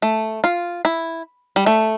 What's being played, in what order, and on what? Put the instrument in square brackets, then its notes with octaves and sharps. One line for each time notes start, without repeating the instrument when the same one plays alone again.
[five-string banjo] A3
F4
E4
G3
A3